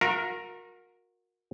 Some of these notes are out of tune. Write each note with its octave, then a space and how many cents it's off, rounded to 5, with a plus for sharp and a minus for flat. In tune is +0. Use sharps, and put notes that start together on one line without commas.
F#4 -40 A#4 +0 E5 +40